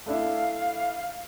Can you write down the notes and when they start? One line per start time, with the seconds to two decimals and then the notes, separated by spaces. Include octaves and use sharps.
0.06 A3 D4 E4 F5